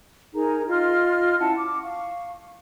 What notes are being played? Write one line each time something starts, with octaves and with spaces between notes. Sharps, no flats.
D#4 G#4 A#4 A#5
F4 D#5 C6 F6
C#4 E4 F#5 A5
D6
F5 C#6